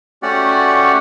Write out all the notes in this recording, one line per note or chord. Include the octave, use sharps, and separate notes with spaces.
A3 C#4 F#4 G4 D5 F#5